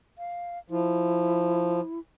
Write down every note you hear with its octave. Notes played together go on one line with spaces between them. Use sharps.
F5
F3 E4